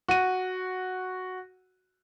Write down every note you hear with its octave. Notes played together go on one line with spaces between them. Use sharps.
F#4 D#7